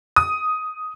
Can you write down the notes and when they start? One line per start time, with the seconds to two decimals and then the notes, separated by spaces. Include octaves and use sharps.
0.16 D#6